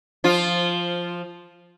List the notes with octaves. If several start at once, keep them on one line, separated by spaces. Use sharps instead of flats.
F3 F4